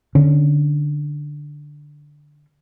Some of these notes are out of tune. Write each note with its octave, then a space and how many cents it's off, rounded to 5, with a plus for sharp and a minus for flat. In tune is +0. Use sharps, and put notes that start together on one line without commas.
D3 +5 C#4 +0